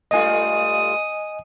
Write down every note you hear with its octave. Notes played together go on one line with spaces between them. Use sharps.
G2 A3 F4 D#5 G#5 D#6